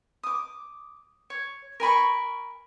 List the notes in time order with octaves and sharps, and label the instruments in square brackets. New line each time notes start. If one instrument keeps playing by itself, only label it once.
[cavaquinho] D6 D#6
C#5
A#4 G#5 B5 C#6